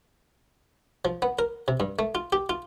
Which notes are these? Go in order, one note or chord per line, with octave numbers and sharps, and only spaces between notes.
F3
B3
A#4
C3
G2
A3
F4
G4
F4